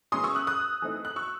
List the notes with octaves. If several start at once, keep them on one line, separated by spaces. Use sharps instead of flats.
E3 G#3 C#4 C6 D#6
C#6 E6
D#6 F#6
D#6 F#6
E3 A3 C4 D#4
F#6
C#6 E6